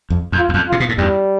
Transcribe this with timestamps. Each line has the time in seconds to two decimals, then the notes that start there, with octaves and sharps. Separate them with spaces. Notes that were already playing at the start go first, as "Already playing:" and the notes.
0.10 F2
0.32 F2
0.39 F4
0.49 E2
0.54 F2
0.69 C3 F4
0.80 B2
0.89 A2
0.98 E2 G2 G3